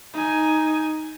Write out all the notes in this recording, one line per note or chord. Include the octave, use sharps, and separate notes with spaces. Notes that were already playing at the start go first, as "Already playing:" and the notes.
D#4 G#5